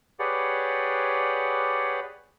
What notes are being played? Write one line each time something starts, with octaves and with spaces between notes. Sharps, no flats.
G4 G#4 B4 C#5 D5 F#5